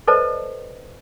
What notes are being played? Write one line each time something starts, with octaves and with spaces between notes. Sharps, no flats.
A4 B4 C5 D5 D#5 A5